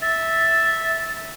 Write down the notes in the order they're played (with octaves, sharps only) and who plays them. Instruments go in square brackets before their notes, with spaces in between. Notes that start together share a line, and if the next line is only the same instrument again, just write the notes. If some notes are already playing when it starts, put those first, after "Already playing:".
[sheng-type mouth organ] E5 [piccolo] A6